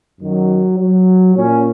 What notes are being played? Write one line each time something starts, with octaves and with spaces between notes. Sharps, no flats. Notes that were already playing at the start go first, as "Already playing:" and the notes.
F#2 D#3 F#3
F#3
A#2 C#4